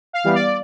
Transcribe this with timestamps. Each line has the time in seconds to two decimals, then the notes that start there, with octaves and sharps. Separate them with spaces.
0.13 F5
0.24 E3 G3 B3
0.35 D5